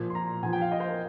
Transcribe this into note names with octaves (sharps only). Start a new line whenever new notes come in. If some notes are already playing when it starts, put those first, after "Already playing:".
Already playing: A#2 F3
C6
A#5
A#2 F3 G#5
G5
F5
D#5
C5
A#4